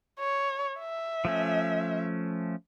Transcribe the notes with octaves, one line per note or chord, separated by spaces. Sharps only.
C#5
E5
F3 A3 C#4